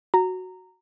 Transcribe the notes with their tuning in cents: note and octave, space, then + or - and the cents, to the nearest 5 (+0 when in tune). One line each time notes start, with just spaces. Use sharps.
F#4 +0 A#5 -15